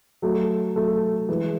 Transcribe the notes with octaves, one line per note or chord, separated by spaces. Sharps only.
F#3 A3
F#3 A3
E3 G#3